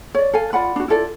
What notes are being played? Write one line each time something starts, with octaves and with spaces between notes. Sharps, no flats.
C#5 D5
A4 F5 G#5
F4 D5 F#5 B5
D4 F#4
E4 F4 A4 D5